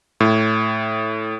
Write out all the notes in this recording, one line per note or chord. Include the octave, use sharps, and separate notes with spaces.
A2